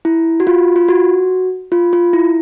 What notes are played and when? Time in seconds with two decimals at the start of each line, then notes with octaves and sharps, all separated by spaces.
0.05 E4
0.40 F#4
0.47 F4
0.76 F4
0.88 F#4
1.72 F4
1.93 F4
2.13 E4